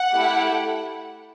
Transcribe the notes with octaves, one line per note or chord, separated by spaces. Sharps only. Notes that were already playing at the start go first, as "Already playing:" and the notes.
Already playing: F#5
A3 E4 G4